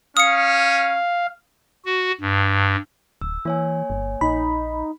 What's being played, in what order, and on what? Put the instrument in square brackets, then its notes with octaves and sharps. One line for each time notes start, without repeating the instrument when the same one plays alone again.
[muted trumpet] C#4 [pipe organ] F5 [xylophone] D#6 C#7
[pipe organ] F#4
G2
[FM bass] D1 [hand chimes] E6
[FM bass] E3 [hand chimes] A#3 C#5 G#5
[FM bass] G1
[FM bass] A#1 [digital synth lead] D#4 [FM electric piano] B5